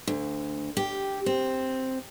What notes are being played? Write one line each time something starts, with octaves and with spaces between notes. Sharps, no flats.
D2
G4
C4